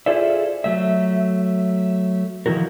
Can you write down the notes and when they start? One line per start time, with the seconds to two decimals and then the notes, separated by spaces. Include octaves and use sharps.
0.06 F4 G#4 A4 C5 D5 E5
0.64 F#3 A3 E5
2.46 D#3 F3 E4 F#4 A#4